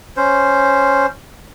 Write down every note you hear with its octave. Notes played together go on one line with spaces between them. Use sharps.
C#4 C5